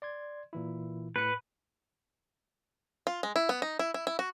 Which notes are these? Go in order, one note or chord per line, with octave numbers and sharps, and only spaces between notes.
D5 C6 G#6
A#2 E3 E4
A2 B4 C#7
F4
G#3
E4
B3
D#4
E4
E4
E4
F#4